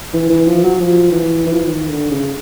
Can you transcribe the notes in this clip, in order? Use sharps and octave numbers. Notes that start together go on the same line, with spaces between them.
E3
E3
F3
F#3
F3
E3
E3
F3
E3
D#3
D3
C#3